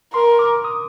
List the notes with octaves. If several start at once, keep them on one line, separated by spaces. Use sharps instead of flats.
A#4 C6
D6
D#6